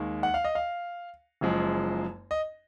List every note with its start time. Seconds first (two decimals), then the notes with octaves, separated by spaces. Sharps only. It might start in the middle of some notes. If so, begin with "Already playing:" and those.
Already playing: D#2 D#3 G#3
0.23 F#5
0.34 F5
0.45 D#5
0.55 F5
1.41 F#1 F#2 F3 G#3
2.31 D#5